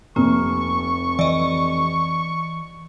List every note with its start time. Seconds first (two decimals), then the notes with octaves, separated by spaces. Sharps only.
0.16 F1 C3 A#3 C#6
1.19 E3 D5 D#5